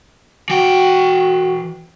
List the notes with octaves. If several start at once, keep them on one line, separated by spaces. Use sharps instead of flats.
E3 F#4 G5